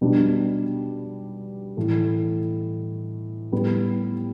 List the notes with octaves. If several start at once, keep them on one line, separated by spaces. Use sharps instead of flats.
B2 G3 B3 D4
A2 E3 A3
A2 G3 B3